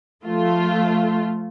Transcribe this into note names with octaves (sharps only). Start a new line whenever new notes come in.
F3 A3 F4